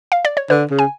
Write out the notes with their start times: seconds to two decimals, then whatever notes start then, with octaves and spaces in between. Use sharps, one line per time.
0.12 F5
0.25 D5
0.37 C#5
0.50 D3 B4
0.70 C#3
0.79 G#5